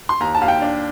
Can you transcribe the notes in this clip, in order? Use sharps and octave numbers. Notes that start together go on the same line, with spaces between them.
C6
D#2 A#5
A5
D#2 F5
G5
D4